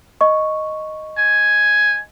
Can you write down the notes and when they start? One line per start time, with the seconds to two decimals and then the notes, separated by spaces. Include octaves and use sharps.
0.21 D#5 C#6
1.18 G#5